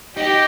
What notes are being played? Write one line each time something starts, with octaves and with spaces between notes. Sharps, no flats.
D#4 G4